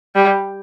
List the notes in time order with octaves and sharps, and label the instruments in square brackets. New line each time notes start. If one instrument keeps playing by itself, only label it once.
[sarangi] G3